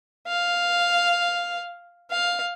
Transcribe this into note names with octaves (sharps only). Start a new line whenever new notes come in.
F5
F5